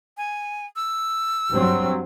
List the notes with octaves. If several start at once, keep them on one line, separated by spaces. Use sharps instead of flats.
G#5
E6
G2 F#3 C4